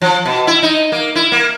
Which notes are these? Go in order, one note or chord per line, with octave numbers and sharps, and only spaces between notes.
F3
B2
E4
D#4
A#3
E4
A#3